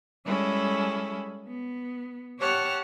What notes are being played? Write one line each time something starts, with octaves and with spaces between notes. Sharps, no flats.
G3 G#3 C#4 E4 A4
B3
G4 C#5 F#5 A5 F6